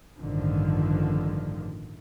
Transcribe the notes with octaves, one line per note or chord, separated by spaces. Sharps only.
A1 G2 D3 D#3 F3